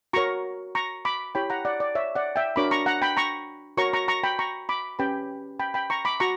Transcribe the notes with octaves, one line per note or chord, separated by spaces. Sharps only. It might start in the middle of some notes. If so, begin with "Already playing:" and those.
F#4 A#4 C#5 A#5 C#6
A#5 C#6
B5 D6
E4 G4 C#5 G5 B5
F#5 A#5
D5 F#5
D5
C#5 E5
D5 F#5
E5 G5
D4 F#4 A#4 C#5 B5 D6
A#5 C#6
F#5 A#5
G5 B5
A#5 C#6
F#4 A#4 C#5 A#5 C#6
A#5 C#6
A#5 C#6
G5 B5
A#5 C#6
B5 D6
C#4 G4 B4 G5 B5
G5 B5
G5 B5
A#5 C#6
B5 D6
F#4 A#5 C#6